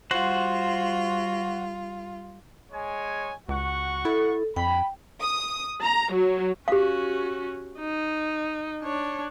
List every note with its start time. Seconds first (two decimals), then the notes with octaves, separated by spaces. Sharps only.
0.11 G3 F4 F#4 C5 F#5
2.72 G#3 C#5 G#5
3.49 C#2 F#4 F#5 C#6
4.05 E4 A4
4.56 F2 G5 B5
5.21 D#6
5.81 A#5
6.14 F#3
6.68 C#4 F#4 G4 F5
7.79 D#4
8.82 D4 C#5